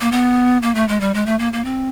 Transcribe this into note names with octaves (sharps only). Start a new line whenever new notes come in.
A#3
B3
A#3
A3
G#3
G3
G#3
A3
A#3
A#3
C4